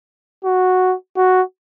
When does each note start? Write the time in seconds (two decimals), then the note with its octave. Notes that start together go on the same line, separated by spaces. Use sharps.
0.45 F#4
1.17 F#4